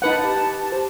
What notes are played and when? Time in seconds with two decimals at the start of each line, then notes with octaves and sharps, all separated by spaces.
0.02 D#4 B4 F#5 A5
0.23 G4
0.72 C5